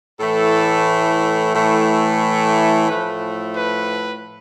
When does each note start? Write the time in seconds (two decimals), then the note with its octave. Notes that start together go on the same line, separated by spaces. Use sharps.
0.19 A2 E3 A3 A4
1.54 A2 E3 A3
2.88 A2 F3 A3 B4
3.55 B4